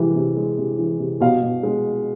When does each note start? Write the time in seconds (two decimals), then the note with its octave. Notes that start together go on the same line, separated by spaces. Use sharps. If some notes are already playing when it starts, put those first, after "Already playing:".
Already playing: C3 E3 G#3
0.16 C3
0.37 G#3
0.58 C3
0.79 E3
0.99 C3
1.20 B2 F5
1.42 B2
1.63 G#3